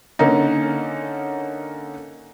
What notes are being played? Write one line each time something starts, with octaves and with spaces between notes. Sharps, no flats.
D3 A#3 C#4 D#4